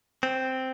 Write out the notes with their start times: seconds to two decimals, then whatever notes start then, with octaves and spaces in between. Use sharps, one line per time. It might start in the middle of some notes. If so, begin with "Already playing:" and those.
0.23 C4